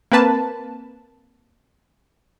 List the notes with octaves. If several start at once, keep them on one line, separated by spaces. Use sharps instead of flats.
A#3 C4 B4 A5